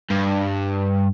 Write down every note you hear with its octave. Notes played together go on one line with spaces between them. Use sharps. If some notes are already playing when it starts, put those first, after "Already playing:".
G2